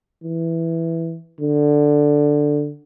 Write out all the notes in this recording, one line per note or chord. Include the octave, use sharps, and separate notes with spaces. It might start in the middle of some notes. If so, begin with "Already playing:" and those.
E3
D3